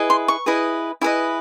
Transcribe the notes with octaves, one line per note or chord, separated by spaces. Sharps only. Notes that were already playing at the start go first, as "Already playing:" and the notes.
Already playing: E4 G#4 B4 D#5
C6
C#6
E4 G#4 B4 D#5
E4 G#4 B4 D#5